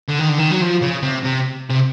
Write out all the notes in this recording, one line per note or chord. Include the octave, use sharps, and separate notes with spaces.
D3
D#3
D3
D#3
F#3
F3
C#3
C3
C3
C3